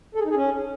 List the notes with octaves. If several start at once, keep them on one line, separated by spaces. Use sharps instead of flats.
A4
G#4
D#4
G#4
C#4